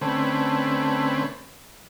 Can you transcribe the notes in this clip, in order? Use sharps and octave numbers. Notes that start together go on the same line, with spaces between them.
D3 A3 C4 C#4 B4